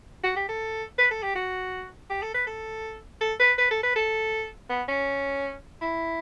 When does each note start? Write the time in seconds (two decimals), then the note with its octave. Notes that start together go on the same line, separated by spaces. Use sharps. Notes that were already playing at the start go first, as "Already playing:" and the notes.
0.23 F#4
0.36 G4
0.49 A4
0.98 B4
1.11 A4
1.23 G4
1.35 F#4
2.10 G4
2.22 A4
2.34 B4
2.47 A4
3.21 A4
3.39 B4
3.58 B4
3.71 A4
3.83 B4
3.96 A4
4.69 B3
4.88 C#4
5.81 E4